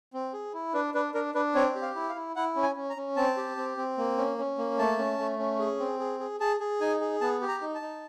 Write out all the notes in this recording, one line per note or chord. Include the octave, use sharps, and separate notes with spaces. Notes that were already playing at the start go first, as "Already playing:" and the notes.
C4
G#4
E4
D4 B4
D4 B4
D4 A#4
D4 B4
C4 C#5
G4
F5
E4
F5
E4
E4 F#5
C#4
G#5
C#4
A#5
C#4
C4 A5
G4
C4
C4
A#3
C#4
C#4
A#3
A3 A5
C#4
A3
C#4
G#4
C4
G#4
G#4
G#4 A5
G#4
D#4 G#5
G#4
B3 A5
G4
A#5
D#4
A5
D#4